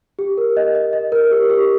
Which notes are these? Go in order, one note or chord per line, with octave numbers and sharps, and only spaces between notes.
G4
A#4
D#5
D#5
D#5
A#4
G4
G4